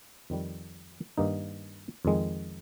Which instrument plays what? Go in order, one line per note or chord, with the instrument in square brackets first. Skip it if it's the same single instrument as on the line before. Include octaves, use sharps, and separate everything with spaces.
[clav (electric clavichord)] F2 D#3 G3
G2 D#3 A#3 D#4
F2 D#3 G#3